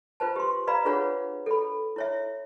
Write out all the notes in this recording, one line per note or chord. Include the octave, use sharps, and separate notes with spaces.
F4 B4 C5 A5
G4 C6
B4 D5 F5 A#5 B5
D4 F4 G#4 B4 C#5 F#5
A4 B5
E4 C#5 E5